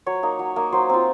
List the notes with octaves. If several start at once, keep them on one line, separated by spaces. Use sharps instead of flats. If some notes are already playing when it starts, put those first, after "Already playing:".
F#3 C#5
A#3 D#4
F#3
A#3 D#4
F#3 C5
C4 F4